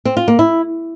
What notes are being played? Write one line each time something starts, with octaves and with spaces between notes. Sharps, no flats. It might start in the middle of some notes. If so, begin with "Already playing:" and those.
C4
F4
A#3
E4